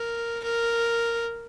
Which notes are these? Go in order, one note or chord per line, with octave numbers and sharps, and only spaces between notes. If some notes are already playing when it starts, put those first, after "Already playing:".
Already playing: A#4
A#4